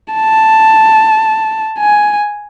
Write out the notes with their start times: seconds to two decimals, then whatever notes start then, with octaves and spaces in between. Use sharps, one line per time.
0.14 A5
1.79 G#5